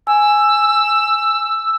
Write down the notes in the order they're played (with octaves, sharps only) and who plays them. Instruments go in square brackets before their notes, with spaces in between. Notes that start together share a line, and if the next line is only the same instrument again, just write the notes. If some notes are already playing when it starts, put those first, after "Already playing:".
[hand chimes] G#5 [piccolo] E6